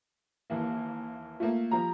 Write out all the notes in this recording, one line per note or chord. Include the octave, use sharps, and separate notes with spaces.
D#2 E3 A#3
A3 A#3 F4
F3 G3 A#5